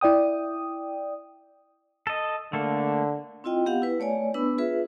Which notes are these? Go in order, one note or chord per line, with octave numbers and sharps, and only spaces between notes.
E4 D5 G5 D#6
A4 D#5
D3 A3 A#3 A4
C4 E4 F4 D#5 G5
B3 G4 F5 F#5
E4 B4
A3 C#5 D5 G#5
B3 D4 B4 B5 E6
F4 G#4 B4 E5